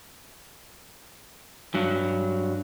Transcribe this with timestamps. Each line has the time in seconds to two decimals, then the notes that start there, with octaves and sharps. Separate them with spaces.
1.75 G2 F#3